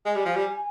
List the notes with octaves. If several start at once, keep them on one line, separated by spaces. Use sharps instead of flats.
G#3 G#5
G3
F3
G3